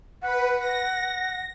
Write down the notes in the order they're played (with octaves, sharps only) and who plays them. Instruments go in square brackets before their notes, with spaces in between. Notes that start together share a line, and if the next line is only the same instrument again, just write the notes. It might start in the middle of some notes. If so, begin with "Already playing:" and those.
[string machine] B4 [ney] F#5
[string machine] A#6